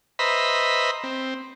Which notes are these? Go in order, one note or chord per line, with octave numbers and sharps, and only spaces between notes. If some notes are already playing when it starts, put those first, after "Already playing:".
B4 C5 D#5 E5 A#5 B5
C4